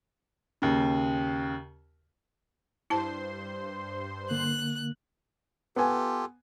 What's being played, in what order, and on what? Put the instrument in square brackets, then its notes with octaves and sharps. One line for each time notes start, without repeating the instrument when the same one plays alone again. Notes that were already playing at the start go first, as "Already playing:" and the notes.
[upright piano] D#2 C#3
[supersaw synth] G2 C5 C6 [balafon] E4 A5
[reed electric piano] D3 A#3 [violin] F#6
[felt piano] B3 G#5 [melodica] F4 G4 A4